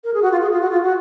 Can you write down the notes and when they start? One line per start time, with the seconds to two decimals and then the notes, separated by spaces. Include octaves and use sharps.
0.04 A#4
0.14 G#4
0.22 F#4
0.32 F4
0.42 G#4
0.52 F4
0.61 F#4
0.70 F4
0.83 F#4